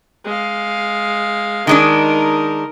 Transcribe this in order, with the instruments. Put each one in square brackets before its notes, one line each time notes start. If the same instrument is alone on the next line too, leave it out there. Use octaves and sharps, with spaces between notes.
[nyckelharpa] G#3 F5
[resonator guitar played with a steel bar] D#3 G#3 D4 [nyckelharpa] D#4 A#4